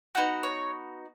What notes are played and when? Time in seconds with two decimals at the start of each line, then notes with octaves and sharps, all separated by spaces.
0.15 B3 D#4 F#4 F#5
0.43 C#5